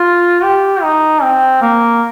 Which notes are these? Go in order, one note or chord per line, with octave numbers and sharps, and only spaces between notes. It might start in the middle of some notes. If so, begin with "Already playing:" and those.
Already playing: F4
G4
D#4
C4
A#3